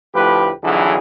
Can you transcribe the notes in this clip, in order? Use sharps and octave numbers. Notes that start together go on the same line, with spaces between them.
D2 A2 F3 G4 B4
B1 F2 D3 E3 F#3 G#4